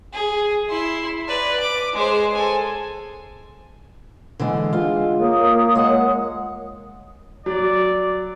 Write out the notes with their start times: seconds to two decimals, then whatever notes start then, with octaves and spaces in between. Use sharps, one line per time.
0.13 G#4
0.69 E4 C6
1.28 B4 D5
1.60 D6
1.94 G#3 C5
2.34 A4 G#5
4.40 D3 E3 G#3
4.73 G#3 F4
5.19 A#3 A#4 C#5 D#6
5.75 G#3 F#5
7.46 F#3 D5